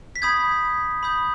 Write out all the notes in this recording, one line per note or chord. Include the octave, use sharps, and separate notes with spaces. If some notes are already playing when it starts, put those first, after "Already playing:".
B6
B5 D#6 G6 G#6
B5 D#6 G6